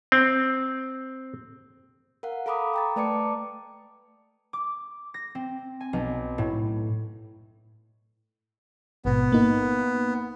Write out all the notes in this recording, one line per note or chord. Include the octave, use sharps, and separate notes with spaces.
C4
A#4 F5 F#5
A4 F5 A#5 B5 D6 D#6
G5 A#5 A6
A3 B4 D5 A5 D6 C#7
D6
A#6
C4
G#5
B1
A2
A1 G#2 B2 B3
A#3 D#4